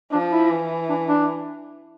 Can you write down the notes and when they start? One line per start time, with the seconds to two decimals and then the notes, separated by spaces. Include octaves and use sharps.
0.12 F3 D4
0.32 E4
0.50 E3
0.89 D4
1.09 D4